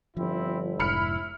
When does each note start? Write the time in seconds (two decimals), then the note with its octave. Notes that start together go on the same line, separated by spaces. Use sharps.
0.17 G1 F3 C4 E4
0.80 F1 G#2 E4 B5 F6 C#7